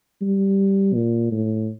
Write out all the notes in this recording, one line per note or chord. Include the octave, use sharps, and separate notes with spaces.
G3
A#2
A2